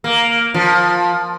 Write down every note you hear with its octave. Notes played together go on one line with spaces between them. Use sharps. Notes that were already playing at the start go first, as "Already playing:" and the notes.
A#3
F3